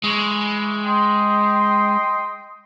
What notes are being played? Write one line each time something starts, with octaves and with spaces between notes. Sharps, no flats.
E3 G#3 C#6
D#5 G5 C6